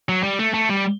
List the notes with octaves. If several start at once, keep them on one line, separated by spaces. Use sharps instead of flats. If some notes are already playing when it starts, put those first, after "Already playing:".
F#3
G3
A3
A3
G3